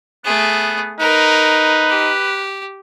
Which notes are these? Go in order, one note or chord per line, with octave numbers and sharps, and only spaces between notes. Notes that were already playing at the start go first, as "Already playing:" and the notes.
A3 B3 G#4
D#4 A#4 B4
G4